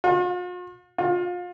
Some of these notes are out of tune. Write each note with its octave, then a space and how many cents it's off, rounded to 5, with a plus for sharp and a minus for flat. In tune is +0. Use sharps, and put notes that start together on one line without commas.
F4 +45
F4 +30